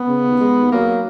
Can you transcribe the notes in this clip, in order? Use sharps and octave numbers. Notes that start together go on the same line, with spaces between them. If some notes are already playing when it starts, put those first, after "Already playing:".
Already playing: B3
C#3
D#2
G#3
D#2
F#3 A#3